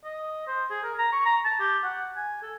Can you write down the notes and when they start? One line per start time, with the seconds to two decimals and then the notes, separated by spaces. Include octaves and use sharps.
0.04 D#5
0.47 C5
0.70 G#4
0.83 A#4
0.98 A#5
1.13 C#6
1.26 A#5
1.45 A5
1.60 G4
1.84 F#5
2.17 G#5
2.42 A4